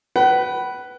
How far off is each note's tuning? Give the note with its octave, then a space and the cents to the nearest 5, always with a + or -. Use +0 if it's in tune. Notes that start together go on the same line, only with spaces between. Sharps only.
B4 +0 F#5 +45 B5 -5